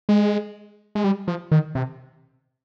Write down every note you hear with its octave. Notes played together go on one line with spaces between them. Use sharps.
G#3
G#3
G3
F3
D#3
C3